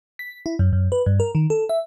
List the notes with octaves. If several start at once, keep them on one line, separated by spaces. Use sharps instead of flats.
B6
E4
F#2
F#2
B4
G2
A#4
D#3
A4
E5